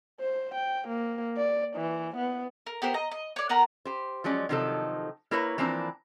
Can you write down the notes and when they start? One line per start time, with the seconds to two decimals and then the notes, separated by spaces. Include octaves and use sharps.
0.20 C5
0.54 G5
0.88 A#3
1.37 D5
1.76 E3
2.17 B3
2.66 A#4
2.82 B3 G4 A#4 C5
2.94 D#5 A#5
3.11 D#5
3.36 C#5 D5
3.49 B3 F#4 A#4 A#5
3.85 G4 C5
4.24 F3 F#3 G#3 C#4 D5
4.49 C3 D#3 F3 F#3 D#4 A4
5.31 A#3 E4 A#4 B4 C#5 A#5
5.58 E3 F3 A#3 C4 D4 A#5